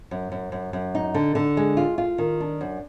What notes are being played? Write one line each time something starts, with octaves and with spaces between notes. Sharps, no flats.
F#2
F#2
F#2
F#2
D#4
D3
D3
G#3
F4
F4
D#3
D4
F#2